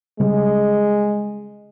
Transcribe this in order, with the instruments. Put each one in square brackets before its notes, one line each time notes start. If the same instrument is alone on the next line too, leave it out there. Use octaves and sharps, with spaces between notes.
[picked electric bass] C#3 G3 C#4 [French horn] G#3